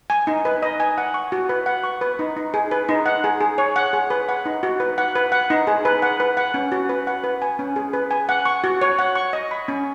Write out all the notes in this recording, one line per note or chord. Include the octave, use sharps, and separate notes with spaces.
G#5
D#4
B4
D#5
G#5
F#5
C#6
F#4
B4
F#5
C#6
B4
D#4
D#4
G#4
B4
D#4
F#5
G#4
G#4
C#5
F#5
G#4
B4
F#5
D#4
F#4
B4
F#5
B4
F#5
D#4
G#4
B4
F#5
B4
F#5
C#4
F#4
B4
F#5
B4
G#5
C#4
G#4
B4
G#5
F#5
C#6
F#4
C#5
F#5
C#6
D#5
B5
C#4